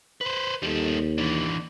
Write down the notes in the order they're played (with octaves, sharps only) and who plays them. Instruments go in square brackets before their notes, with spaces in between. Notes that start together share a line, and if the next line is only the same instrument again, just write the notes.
[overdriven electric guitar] B4 C5
[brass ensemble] D#2 [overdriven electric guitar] G3 A4
[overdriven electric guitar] E3 D4